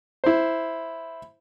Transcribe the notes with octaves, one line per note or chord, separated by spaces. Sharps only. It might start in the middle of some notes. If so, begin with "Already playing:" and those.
E4 C5